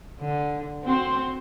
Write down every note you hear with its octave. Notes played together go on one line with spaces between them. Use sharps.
D3
C4 F#4 C5